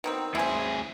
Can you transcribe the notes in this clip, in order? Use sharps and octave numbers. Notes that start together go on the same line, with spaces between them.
B2 D#3 C4
D2 E4 G#4 C5